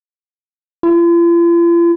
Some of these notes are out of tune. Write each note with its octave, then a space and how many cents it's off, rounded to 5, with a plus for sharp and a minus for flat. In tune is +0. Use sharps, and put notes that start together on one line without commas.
F4 -45